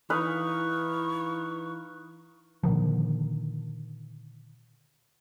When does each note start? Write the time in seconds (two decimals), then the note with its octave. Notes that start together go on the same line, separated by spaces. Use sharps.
0.10 E3 D#4 B4 F5 C#6
2.63 A#2 D3 D#3 F3